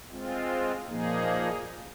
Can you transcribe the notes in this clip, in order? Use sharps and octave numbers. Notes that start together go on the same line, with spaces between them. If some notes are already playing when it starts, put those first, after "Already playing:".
G#3 C4 F4
A#2 F3 A#3 D#4 G#4